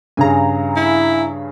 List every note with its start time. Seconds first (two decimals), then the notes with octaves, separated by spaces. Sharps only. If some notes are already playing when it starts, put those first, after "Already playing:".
0.17 G2 C#3 G#4 G#5 A#5
0.76 E4